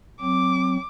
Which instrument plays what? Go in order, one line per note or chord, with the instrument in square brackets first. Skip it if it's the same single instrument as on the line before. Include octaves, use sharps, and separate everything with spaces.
[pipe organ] F#3 C4 [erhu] D6